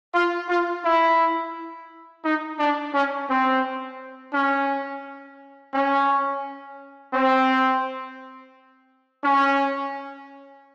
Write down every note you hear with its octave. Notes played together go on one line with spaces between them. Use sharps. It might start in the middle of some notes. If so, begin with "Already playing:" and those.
F4
F4
E4
D#4
D4
C#4
C4
C#4
C#4
C4
C#4